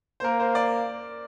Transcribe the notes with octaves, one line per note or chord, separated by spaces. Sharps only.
C5
A#3 A#4
C5
D5